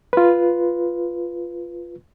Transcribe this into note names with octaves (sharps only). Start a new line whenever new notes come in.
F4 B4